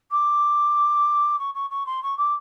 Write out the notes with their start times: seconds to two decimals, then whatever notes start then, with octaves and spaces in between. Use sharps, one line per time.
0.11 D6
1.39 C#6
1.54 C#6
1.70 C#6
1.86 C6
2.02 C#6
2.17 D6